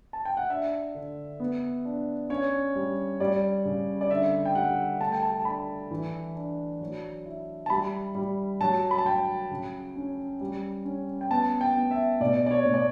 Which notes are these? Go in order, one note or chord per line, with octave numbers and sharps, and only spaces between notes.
A5
G5
F#5
D4 E5
D3
B3
D4
C#4 C#5
G3
G3 D5
C#3
D5
D3 E5
G5
G3 F#5
A3 A5
G5
A5
A5
D4 B5
E3
D4
F#3
E4
A5
G3 B5
G3
F#3 A5
B5
A5
F#3 G5
C#3
C#4
G3
C#4
G5
B3 A5
G5
B3
E5
B2 D5
D5
C#5
B2
D5